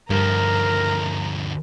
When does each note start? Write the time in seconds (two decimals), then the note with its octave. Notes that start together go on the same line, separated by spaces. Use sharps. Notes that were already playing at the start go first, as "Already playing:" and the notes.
0.10 D2 G2 F3 A#4 A#5